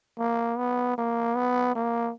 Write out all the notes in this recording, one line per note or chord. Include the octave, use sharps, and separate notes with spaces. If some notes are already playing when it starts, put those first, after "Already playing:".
A#3
B3
A#3
B3
A#3